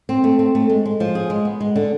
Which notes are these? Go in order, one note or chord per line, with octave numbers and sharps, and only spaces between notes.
C4
A3
C4
A3
G#3
G#3
F3
G#4
G#3
B3
G#3
D3